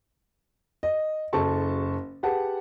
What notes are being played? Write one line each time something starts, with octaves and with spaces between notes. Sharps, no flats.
D#5
F#1 A4 A5 C#6
G4 G#4 B4 F#5 A5